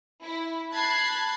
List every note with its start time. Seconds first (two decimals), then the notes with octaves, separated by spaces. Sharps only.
0.23 E4
0.72 A5 B5 F#6 G#6 C7